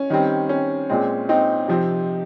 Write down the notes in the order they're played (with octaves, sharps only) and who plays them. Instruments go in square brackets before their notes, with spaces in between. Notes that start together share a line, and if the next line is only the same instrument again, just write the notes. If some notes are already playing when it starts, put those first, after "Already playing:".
Already playing: [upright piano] C#4
D#3 G3 C4
C#4
A#2 G#3 C4
C4 D#4
C3 F3 C4